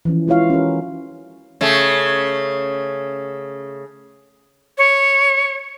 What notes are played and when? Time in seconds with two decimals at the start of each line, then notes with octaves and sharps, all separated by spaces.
0.05 E3 F3 C#4
0.27 G#3 E4 F4 C#5 F5
0.50 C#4 F#4 A#4
1.61 C#3 A3
4.78 C#5